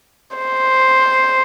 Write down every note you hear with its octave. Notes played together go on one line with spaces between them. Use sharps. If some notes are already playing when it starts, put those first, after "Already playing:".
C5